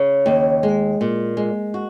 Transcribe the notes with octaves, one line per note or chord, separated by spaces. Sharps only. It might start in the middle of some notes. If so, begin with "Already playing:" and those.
Already playing: C#3
D#2
G#3
A#2
G#3
F#4